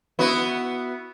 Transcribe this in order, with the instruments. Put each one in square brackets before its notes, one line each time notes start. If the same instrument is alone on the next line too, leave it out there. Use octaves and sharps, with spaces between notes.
[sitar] B3 E4 F#4